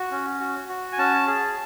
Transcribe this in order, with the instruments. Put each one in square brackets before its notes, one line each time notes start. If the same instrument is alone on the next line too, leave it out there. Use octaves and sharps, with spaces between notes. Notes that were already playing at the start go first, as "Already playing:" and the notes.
Already playing: [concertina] F#4
C#4
F#4
F#4
G#5
C#4 A5
G#4